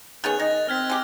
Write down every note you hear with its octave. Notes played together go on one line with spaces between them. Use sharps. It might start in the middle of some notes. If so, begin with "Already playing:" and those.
D#3 B3 C#4 G#4 F#6 A6 F7
D#3 D#5 A#6
C4 F6 G#6 B6
G#3 G4